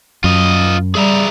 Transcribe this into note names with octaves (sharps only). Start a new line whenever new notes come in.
F#2 F4 D#5
G3 G#4 E5 A#5